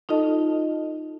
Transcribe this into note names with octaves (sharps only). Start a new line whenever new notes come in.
D#4 F4 A4 D#5 A5